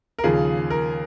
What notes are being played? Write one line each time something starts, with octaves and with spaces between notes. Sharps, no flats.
A#4
D#2 C#3 F3 G#4
A#4